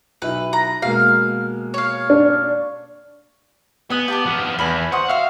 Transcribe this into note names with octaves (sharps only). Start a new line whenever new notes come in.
B1 E4 B4
A#5
B2 G#3 A#3 F5
C#5 F5
D4
B3 G#5 D#6
G4 A5 D6
F3 B3
E2 G#5 A5 B5
C5 F#5 C#6 D#6
F#4 E5 F5